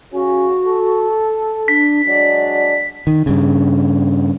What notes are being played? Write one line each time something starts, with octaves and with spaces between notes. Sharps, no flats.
C#3 C#4 F#4
A4
D4 B6
F#3 G#3 D4 D5
D#3
G2 C#3